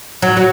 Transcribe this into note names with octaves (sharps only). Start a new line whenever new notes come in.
F#3
F#3